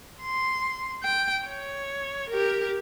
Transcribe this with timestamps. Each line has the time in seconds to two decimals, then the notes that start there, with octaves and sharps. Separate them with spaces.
0.21 C6
1.03 G5
1.46 C#5
2.30 G4 A#4